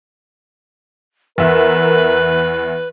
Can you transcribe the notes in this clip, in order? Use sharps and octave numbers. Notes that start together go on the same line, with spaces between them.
E2 A#4 B4 E5